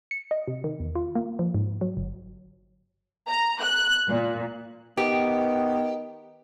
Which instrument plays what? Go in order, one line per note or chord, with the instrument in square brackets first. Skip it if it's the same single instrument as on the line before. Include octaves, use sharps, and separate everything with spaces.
[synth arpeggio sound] C#7
D#5
C3
D#3
E2
F4
A#3
F3
G#2
F#3
G1
[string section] A#5
F#6
A#2
[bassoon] D#3 [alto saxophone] B3 [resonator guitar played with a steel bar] G4